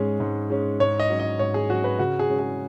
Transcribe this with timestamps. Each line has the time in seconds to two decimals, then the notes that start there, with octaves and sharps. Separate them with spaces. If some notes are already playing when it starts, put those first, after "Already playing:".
Already playing: G#2 G#3 C#4 G#4
0.20 G#2
0.50 G#3 C#4
0.80 G#2 C#5
1.00 D#5
1.10 F#3 C#4
1.20 D#5
1.39 G#2 C#5
1.54 G#4
1.69 F#3 C#4 F#4
1.84 B4
1.99 C#3 F#4
2.19 G#4
2.29 G#3 C#4
2.39 G#4